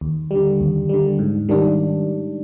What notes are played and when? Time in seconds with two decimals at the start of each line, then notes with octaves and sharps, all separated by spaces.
0.01 D#2
0.31 D3 G3
0.60 D#2
0.89 D3 G3
1.19 G#2
1.49 D#3 G3 D4